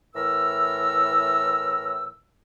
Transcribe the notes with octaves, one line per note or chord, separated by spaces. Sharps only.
A2 E3 A#4 E6